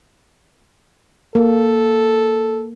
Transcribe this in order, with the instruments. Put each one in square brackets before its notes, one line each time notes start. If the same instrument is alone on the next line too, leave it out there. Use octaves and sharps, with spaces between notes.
[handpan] A#3 [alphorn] A4